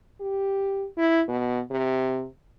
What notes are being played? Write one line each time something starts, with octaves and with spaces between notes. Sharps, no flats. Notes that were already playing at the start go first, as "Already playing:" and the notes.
G4
E4
B2
C3